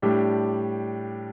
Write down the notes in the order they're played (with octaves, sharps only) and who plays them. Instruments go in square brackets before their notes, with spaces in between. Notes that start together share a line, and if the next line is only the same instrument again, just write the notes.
[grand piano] A2 G3 D4 G4